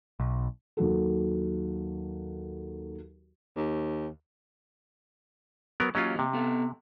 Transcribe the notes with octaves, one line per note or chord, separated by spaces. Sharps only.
B1
D#2 F#3 F#4 A4
D#2
F#3 B3 A#4
F#3 A#3 C#4 F4 G4 D#5
C3
B3 A4